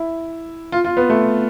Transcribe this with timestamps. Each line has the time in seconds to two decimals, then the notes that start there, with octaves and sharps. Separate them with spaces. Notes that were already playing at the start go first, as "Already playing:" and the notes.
Already playing: E4
0.72 F4
0.85 F4
0.97 B3
1.10 A3